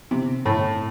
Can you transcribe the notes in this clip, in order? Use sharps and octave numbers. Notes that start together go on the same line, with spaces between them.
C3
A2